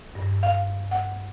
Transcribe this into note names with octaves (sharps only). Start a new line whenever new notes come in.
G2
F5
F#5